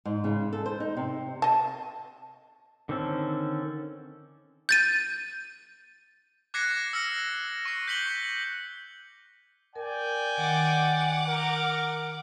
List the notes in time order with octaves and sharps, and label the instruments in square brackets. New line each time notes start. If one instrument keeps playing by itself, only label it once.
[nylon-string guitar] G#2
C#3
A4
C5
D#4
C3
[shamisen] D#5 A5
[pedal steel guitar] D3 D#3 C4 C#4 A4
[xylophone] G6 A6 D#7
[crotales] D6 F#6 G#6 A#6 C7 C#7
E6 F6 A#6 C#7
C#6 C7
G6 B6 C#7 F#7 G7
[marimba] A#4 [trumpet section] D5 G5 G#5
[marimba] D#3 [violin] F#5 D6
[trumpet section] A#4